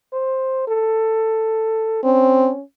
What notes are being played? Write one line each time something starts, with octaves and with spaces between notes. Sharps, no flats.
C5
A4
C4 C#4